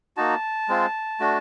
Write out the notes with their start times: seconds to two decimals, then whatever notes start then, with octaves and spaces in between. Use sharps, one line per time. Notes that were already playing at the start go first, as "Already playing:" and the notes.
0.17 A#3 D#4 F#4 A5
0.69 G#3 C4 F4
1.20 A3 D4 F#4